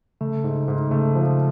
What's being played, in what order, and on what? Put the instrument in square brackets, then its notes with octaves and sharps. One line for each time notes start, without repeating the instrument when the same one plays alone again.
[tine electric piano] C#3 [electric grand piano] A3
[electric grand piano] G#2
G#2
[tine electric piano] C#3 [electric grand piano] A3
[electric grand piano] F3